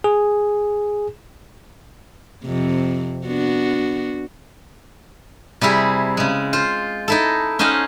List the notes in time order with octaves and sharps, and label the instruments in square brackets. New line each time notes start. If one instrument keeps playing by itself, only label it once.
[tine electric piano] G#4
[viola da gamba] F2 C3
B3 D4 F#4
[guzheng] C3 G3 E4 G#4
C#3 G#3
F4 C5
D#4 E4 A4
C#4 D#4 C5 D#5 F5 F#5